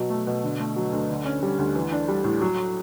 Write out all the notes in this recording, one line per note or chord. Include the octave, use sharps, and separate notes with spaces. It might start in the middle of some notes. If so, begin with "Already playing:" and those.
Already playing: B2 F#3
A3
B2
D3
A3
F#3
D2
D3
C#4
G3
D2
E3
D4
G3
A2
F#3